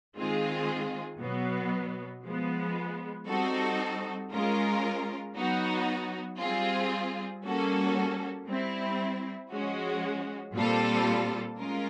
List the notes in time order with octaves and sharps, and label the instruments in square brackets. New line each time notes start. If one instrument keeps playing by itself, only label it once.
[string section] D#3 G#3 C4 F4 G#4
B2 F#3 B3
F3 G#3 B3
G3 C4 D#4 F#4 A4
G#3 C#4 F4 A#4
F#3 B3 D#4 F#4
G3 C4 F4 G#4
G3 A#3 C#4 F#4 A4
G3 C4 E4
F3 G#3 C#4 F#4
A#2 G3 C4 F4 A4
G#3 C#4 F4 A#4